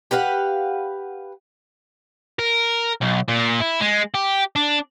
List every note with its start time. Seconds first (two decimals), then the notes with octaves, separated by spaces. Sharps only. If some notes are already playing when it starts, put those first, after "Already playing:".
0.11 G4 B4 F5 F#5
2.39 A#4
3.01 B1
3.28 A#2
3.60 E4
3.80 G#3
4.14 G4
4.56 D4